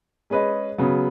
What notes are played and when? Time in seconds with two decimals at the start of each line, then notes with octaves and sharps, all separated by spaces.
0.30 G#3 C#4 G#4 B4 D#5
0.78 C#3 F#3 B3